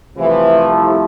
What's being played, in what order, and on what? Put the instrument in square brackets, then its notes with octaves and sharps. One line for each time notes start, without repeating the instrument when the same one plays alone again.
[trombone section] C2 C3 F3 A3 E4 [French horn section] E3